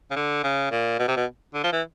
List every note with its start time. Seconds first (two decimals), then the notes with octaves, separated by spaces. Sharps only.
0.11 C#3
0.16 D3
0.44 C#3
0.71 A#2
0.99 B2
1.08 C3
1.17 B2
1.54 D3
1.64 F3
1.73 E3